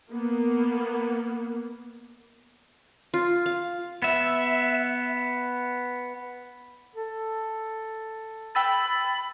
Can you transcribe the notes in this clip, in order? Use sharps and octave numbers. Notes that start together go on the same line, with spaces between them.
A#3 B3
F4
F5
B3 E5
A4
G5 B5 E6 A6